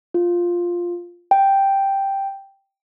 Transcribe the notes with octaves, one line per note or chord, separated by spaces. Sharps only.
F4
G5